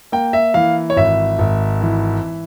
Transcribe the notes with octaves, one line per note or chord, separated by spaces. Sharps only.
A#3 G5
E5
E3 F5
C#5
G#1 E5
G#1
E3